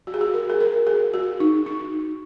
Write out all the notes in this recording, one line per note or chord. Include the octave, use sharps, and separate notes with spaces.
F#4
G#4
F#4
A#4
G#4
A#4
G#4
F#4
D#4
D#4